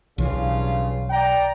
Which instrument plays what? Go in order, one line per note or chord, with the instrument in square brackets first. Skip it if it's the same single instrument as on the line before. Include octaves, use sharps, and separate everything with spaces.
[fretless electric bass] B1 E3 [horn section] G2 C#3 F4
[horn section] D5 G5 A#5